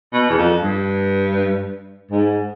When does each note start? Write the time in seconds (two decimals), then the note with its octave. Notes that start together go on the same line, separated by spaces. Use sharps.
0.13 B2
0.30 E2
0.38 F2
0.63 G2
2.11 G#2